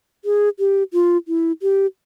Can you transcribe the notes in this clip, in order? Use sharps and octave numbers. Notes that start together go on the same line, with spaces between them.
G#4
G4
F4
E4
G4